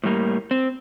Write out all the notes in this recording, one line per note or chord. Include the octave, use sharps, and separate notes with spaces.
A2 G3 A#3
C4